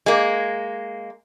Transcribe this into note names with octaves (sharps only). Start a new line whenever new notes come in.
G#3 A#3